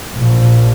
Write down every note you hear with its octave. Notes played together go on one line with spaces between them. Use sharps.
A#1